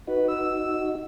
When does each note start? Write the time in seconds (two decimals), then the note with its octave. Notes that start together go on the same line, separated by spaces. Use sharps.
0.07 D#4 F#4 B4
0.28 E6